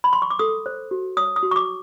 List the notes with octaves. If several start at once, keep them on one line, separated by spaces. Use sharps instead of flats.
B5
C6
C#6
D6
A4 D#6
C5
F#4
C#5 D#6
D#6
F#4
C#6
D6